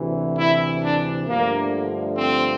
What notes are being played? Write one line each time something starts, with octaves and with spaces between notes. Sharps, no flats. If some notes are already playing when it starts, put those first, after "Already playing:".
Already playing: D2 C3 E3
E4
D4
G2 D3 F3 A3 A#3
C4